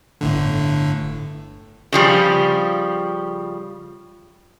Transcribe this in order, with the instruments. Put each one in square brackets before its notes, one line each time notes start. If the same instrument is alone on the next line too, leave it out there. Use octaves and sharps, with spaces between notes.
[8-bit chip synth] G1 A2 D3
[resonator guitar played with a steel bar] C#3 F3 G3